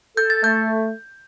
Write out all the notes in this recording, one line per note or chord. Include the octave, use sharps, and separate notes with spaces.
A4 G6
A6
A3 G6